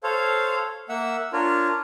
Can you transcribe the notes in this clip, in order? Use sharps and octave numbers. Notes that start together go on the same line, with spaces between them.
A4 C5 C#5 F5
A#3 E5 F#5 E6
D4 F4 A#4 C#5